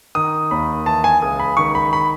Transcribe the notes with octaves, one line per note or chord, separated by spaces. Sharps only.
D#3 D#6
D#2 B5
E3 A5
G#5
C#2 D#6
B5
D#3 C#6
B5
B5